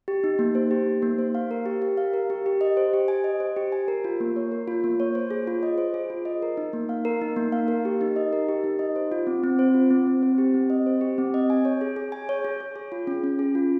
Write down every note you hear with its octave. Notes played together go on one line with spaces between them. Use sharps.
G4
D#4
A#3
C5
G4
D#4
A#3
C5
F5
A#4
G4
G4
F5
A#4
G4
G4
D#5
C5
G4
G#5
D#5
C5
G4
G#5
A#4
F4
A#3
C#5
A#4
F4
A#3
C#5
C5
G#4
F4
D#5
C5
G#4
F4
D#5
A#4
D#4
A#3
F5
A#4
D#4
A#3
F5
A#4
G4
D#4
D#5
A#4
G4
D#4
D#5
C5
F4
C4
C4
C5
F4
C4
C4
C5
G4
C4
D#5
C5
G4
C4
D#5
G#5
C#5
G#4
G#4
G#5
C#5
G#4
G#4
G#4
F4
C#4
C#4
G#4
F4